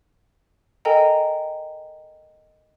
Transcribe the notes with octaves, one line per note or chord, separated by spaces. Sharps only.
A4 A#4 D#5 G5 G#5 A#5